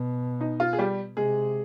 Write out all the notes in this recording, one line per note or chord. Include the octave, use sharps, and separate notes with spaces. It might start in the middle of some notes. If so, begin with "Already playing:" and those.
Already playing: B2
D#4
F4
G#4
G3 G4
C3 G#3 G#4